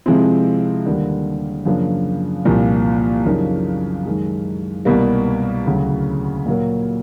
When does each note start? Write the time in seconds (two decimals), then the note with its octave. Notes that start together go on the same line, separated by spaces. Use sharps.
0.06 C3 F3 G#3 C4 E4
0.85 D#2 D3 G3 A#3
1.65 F#2 C#3 F3 A#3 D4
2.45 C2 A#2 F3
3.25 F#2 C#3 F3 A#3 D#4
4.06 F#2 D#3 G#3
4.85 C2 B2 G3 A#3
5.65 D2 C#3 F#3
6.46 A#2 F#3 A#3